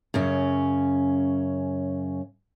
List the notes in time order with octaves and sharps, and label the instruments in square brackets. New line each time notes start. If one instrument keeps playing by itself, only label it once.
[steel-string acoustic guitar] F#2 C#3 C#4